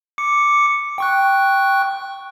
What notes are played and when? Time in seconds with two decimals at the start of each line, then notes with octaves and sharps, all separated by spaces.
0.18 D6 C#7
0.98 G5 C#6 F#6